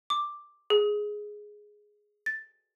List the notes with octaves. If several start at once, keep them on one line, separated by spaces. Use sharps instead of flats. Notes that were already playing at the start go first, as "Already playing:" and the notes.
D6
G#4
A6